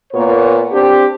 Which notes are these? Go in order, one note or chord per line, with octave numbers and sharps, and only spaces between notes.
A#2 A#3 B3 C#5
C4 D4 G4